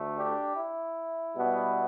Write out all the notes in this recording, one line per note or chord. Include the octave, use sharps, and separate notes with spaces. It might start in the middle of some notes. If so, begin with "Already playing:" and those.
Already playing: D2 D3 A3
D4 G4
E4
B2 G3 B3